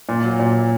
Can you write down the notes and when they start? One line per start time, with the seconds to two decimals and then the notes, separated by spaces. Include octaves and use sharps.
0.09 A#2
0.24 F#3
0.40 A#2